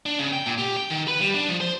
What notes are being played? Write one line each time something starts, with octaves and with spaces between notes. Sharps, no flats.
D4
C#3
G5
A#2
G4
G5
D#3
B4
G3
D4
F3
C5